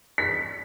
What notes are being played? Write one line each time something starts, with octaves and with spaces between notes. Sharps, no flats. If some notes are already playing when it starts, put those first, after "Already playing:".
B6